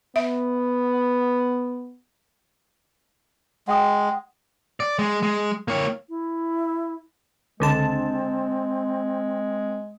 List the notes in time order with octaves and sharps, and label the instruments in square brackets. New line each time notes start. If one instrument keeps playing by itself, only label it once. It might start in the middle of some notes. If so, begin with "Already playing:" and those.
[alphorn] B3 [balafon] E5
[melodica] G#3 [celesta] F#5 G5 D#6
[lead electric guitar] D5
G#3
G#3
A#3 C#5
[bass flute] E4
[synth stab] C#2 D3 A5 [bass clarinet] G#3 [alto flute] C4